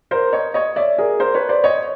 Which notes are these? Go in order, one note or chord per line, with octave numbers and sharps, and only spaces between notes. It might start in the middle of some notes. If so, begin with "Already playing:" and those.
A#4 C5
C#5 D#5
C#5 D#5
D5 E5
G#4 A#4
A#4 C5
B4 C#5
C5 D5
C#5 D#5